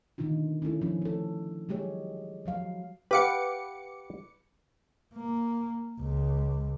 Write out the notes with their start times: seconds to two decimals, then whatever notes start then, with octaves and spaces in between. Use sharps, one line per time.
0.18 B2 D3 D#3 D4 D#4 F4
0.62 C#4 D4 E4 A4
0.82 F3 C#4
1.02 C4 A4
1.69 F#3 G#3 G4 G#4 C#5
2.46 F3 F#3 F5
3.11 G4 B4 F5 F#5 D6 C#7
5.14 A#3
6.00 C#2